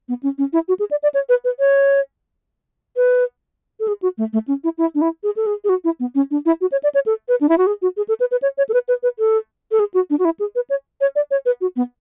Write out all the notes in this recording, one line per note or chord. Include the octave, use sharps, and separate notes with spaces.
B3
C#4
C#4
E4
F#4
G#4
D5
D5
C#5
B4
B4
C#5
B4
A4
G#4
F#4
A3
A3
C#4
E4
E4
D4
E4
G#4
A4
G#4
G#4
F#4
E4
B3
C#4
D4
E4
F#4
C#5
D5
C#5
A4
B4
D4
E4
F#4
G#4
F#4
G#4
A4
B4
B4
C#5
C#5
A4
B4
B4
B4
A4
A4
G#4
F#4
D4
F#4
E4
G#4
B4
C#5
C#5
D5
C#5
B4
F#4
B3